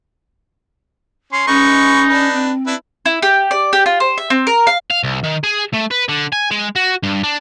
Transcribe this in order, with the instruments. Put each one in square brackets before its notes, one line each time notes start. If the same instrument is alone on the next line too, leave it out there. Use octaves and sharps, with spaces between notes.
[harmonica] C#4 [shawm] C6
[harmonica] G#3 B4 C#6 [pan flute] C#4 [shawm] D#4
[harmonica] D4 B4
[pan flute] C4
[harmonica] D4 E4 B4
[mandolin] E4
G4
D5
G4
F4
C5
E5
C4
A#4
F5
[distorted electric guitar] F5
C2
D#3
G#4
A3
B4
D3
G#5
G#3
F#4
G2
D4